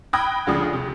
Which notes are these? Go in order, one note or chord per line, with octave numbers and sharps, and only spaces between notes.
G5 B5 D#6 F#6 G#6 A#6
D2 C#3 F3 D4 D#6
C3